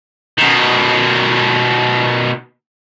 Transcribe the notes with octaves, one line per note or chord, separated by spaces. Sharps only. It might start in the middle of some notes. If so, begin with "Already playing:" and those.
B2 D#3